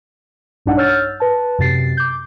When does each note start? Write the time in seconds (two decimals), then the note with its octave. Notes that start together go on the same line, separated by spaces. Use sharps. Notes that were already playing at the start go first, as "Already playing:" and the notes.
0.66 B1 G2 D4 D#4 F#5
0.77 C#5 E6 F6 G6 A6
1.20 B4 A5
1.59 F#2 C3 A6 C7
1.97 D6 G6